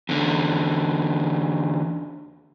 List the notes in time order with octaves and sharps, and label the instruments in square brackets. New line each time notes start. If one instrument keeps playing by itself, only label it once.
[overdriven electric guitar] E2 D3